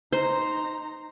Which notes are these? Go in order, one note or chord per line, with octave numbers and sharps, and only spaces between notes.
D#4 C5 A#5